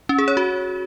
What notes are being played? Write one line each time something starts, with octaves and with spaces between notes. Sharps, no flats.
C#4
G#4
C#5
F#4